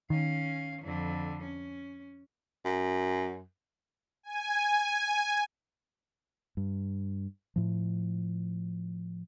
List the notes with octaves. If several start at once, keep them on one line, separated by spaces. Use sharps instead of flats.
D#3 C#4 F5
F2 D3
C#4
F#2
G#5
G2
A2 F3